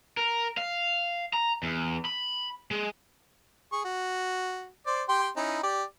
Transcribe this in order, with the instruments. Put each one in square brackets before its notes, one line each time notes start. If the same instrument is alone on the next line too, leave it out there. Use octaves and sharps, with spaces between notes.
[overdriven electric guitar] A#4
F5
A#5
E2
B5
G#3
[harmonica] G#4 C#6
F#4
C5 D5
G4 G5 C6
C#4 D#4 E4
G4 D5